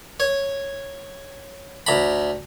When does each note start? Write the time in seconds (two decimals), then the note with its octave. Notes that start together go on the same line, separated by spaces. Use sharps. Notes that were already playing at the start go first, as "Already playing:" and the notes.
0.20 C#5
1.87 D2 A#5 B5